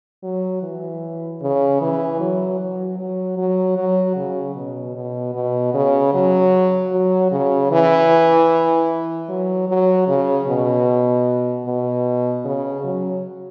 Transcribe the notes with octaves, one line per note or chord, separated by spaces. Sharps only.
F#3
E3
C#3
E3
F#3
F#3
F#3
F#3
F#3
C#3
B2
B2
B2
C#3
F#3
F#3
C#3
E3
F#3
F#3
C#3
B2
B2
C#3
F#3